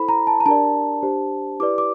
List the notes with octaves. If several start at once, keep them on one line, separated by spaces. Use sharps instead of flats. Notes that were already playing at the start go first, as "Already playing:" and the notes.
Already playing: E4 A4 C5 B5
A#5
A5
A#5
D4 G4 A#4 D5 A5
D4 G4 C5
E4 G4 B4 D5 D6
D6